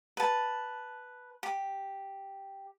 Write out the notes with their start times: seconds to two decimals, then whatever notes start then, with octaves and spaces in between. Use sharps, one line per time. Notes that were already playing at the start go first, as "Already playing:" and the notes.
0.17 B4 A5
1.43 G4